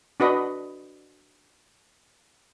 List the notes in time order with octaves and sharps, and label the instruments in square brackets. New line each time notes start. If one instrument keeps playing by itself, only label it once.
[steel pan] D4 F#4 B4 D#5